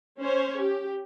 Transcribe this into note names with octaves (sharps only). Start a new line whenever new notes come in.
C#4 C5 C#5
G4